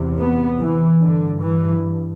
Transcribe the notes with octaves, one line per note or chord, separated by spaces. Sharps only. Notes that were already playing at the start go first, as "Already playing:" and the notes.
Already playing: E2 C3
B3
E3
G2 D3
E3